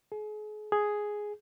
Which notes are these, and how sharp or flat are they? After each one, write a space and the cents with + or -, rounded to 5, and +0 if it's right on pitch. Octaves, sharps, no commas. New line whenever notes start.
G#4 +40
G#4 +5